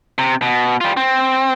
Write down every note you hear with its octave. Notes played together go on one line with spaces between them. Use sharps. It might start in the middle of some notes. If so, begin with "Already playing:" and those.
C3
B2
G3 F4
C4